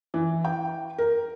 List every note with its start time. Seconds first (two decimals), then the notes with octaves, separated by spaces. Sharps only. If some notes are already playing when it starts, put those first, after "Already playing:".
0.14 E3
0.45 G5
0.98 A#4